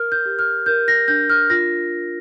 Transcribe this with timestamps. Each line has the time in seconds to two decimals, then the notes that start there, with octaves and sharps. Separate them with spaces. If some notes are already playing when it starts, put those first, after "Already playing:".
Already playing: A#4 F6
0.12 G6
0.26 G4
0.39 F6
0.66 A#4 G6
0.88 A#6
1.08 D4 G6
1.30 F6
1.50 F4 A#6